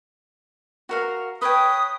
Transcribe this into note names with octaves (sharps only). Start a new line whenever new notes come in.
F#4 A#4 F5
B4 C#5 G5 D#6